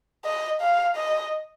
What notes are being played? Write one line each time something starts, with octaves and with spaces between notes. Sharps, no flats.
D#5
F5
D#5